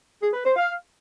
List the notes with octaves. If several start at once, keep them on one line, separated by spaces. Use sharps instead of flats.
G#4
B4
C5
F5